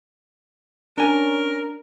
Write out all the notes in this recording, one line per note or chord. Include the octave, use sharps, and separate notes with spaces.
C#4 D4 A#4 G#5